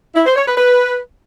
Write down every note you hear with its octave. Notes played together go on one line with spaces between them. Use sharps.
E4
C5
C#5
B4
B4